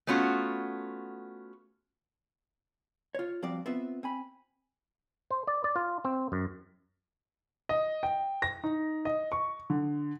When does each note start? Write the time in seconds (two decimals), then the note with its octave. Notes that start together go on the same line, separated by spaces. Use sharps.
0.07 A3 B3 C#4 F4 F#4
3.15 F4 C#5
3.43 F3 G3 C4 F#4 D5
3.66 B3 C4 F4 B4 E5
4.03 C4 G#5 B5
5.31 C5
5.47 D5
5.64 D5
5.76 F4
6.05 C4
6.32 F#2
7.69 D#5
8.03 G5
8.42 A#6
8.64 D#4
9.05 D#5
9.32 C#6
9.70 D3